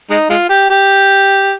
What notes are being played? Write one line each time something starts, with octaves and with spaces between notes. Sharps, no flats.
G#3 D#4
G#3 F4
G4
G4